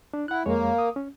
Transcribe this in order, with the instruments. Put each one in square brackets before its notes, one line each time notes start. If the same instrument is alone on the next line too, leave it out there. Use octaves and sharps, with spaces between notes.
[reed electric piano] D4
[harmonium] E4 [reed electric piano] F#5 F#6
[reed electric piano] F2 G#3 C#5 [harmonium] A#3
[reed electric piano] D#6
C#4